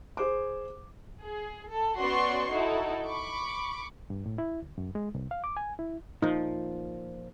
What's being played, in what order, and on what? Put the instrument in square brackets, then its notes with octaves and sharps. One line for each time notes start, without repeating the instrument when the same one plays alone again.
[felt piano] G#4 C5 D6
[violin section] G#4
A4
B3 C#4 F#4 D5 C6 C#6
D#4 E4 F#4 A4
B5 C#6 D6
[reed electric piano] G2
A2
E4
D2
F#2
G#3
C2
F5
D6
G#5
E4
[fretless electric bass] A#2 F3 [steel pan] D#4